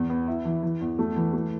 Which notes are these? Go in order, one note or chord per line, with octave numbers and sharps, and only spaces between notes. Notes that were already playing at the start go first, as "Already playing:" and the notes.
Already playing: E2
B3
E4
E3
E3
E2
A3
E3
A3